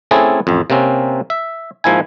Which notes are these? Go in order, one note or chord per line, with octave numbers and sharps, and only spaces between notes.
A3 C4 C#4 E4 G#4 A4
A1 F2
C3 A#3 C4 C#4
E5
G#2 F3 A#3 E4 G#5